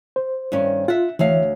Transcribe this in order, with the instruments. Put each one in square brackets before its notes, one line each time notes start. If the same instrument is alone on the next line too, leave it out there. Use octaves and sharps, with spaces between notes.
[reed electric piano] C5
[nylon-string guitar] G2 D#3 C#4
[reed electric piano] F4 [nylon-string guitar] E5 F#5
[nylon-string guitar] D2 C#5 F5 [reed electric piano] E3 E5